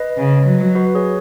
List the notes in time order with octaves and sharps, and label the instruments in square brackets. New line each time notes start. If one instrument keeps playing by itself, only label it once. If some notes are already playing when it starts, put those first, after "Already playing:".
Already playing: [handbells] B4 D#5
[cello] C#3
F#3
[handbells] F#4 B4
G#4 C#5